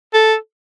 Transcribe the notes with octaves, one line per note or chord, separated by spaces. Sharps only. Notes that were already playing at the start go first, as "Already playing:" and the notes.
A4